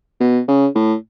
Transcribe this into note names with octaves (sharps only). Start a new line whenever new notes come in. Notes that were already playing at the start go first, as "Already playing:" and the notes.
B2
C#3
A2